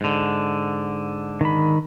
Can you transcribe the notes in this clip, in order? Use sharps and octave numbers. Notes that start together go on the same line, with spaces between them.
G#2 D3
D#3 B5